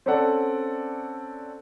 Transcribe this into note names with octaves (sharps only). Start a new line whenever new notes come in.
C4 C#4 A4 D5 F#5